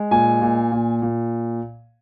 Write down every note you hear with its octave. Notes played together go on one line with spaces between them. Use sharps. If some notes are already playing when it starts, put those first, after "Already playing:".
Already playing: G#3
A#2 G#5
A#2
A#2
A#2